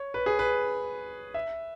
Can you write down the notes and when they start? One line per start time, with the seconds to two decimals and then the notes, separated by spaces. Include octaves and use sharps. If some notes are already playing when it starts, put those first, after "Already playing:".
Already playing: C#5
0.14 B4
0.26 G#4
0.39 B4
1.34 E5